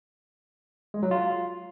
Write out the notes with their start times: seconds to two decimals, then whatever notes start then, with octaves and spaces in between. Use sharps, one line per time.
0.94 G#3
1.03 F#3
1.11 F4